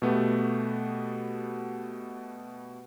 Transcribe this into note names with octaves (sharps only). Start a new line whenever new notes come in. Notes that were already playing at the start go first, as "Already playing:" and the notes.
B2 A3 B3 G4